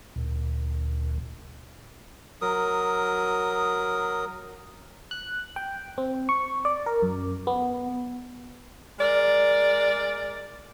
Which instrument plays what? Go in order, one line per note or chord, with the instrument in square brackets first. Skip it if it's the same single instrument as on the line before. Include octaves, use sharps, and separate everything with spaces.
[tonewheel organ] D2 A#2
[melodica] F#3 A#4 D#6
[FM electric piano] F#6
G5
C4
C#6
D5
A#4
F#2
B3
[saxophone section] G#3 A#4 D5